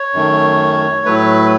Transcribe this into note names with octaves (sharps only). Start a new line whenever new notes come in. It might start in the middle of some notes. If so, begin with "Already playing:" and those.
Already playing: C#5
F#2 D#3 A3
A2 F#3 A3 B4